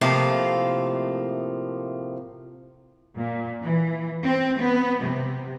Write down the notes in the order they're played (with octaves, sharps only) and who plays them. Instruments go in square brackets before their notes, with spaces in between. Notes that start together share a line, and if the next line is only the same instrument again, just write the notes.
[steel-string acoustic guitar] A2 C3 F3 A3 A#3 F5
[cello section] A#2
E3
C4
B3
C3